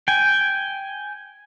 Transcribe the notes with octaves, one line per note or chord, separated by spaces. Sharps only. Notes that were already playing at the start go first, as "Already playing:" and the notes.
G5 G#5